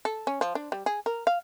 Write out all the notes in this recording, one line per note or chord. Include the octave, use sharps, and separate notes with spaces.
A4
C#4
F3
D4
G3
G#4
A#4
F5